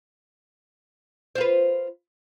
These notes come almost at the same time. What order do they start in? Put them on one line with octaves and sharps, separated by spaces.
C5 F4 B4